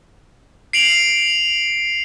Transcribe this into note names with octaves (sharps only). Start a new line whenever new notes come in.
C7 D7 F7 F#7